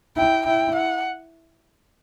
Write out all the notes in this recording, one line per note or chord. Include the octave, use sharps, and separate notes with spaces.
E4 G5
E4 G5
F#5